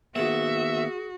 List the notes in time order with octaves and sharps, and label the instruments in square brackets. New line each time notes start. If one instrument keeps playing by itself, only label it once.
[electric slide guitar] D#3 A#3 B3 [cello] F#4 [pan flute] G#4 [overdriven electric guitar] E5